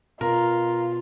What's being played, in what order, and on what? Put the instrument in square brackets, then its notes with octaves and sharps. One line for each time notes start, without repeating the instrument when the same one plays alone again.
[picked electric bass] B2 [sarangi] F4 [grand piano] A#4